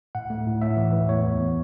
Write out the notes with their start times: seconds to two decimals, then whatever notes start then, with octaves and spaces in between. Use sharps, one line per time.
0.15 A2 F#5
0.30 A3
0.46 A2
0.62 A2 E5
0.77 E3
0.93 E3
1.08 E2 C#5
1.25 B3
1.39 E3